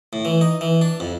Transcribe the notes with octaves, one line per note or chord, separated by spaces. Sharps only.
A2
E3
D#4
E3
D4
F2